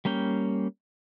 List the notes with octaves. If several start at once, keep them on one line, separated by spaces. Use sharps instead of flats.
G3 A#3 C#4 G5